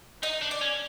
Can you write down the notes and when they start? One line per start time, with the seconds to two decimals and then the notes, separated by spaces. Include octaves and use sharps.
0.23 D#4 D#5
0.42 D4
0.51 D5
0.61 C#4